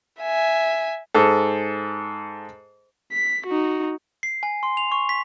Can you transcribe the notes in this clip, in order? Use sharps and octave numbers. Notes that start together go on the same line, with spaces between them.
E5 G#5
G#2 A4
B6
D#4 F#4
C7
G#5
C6
F7
C#6
B6